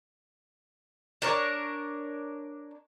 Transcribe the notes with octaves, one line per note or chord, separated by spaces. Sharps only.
D4 A#4 C#5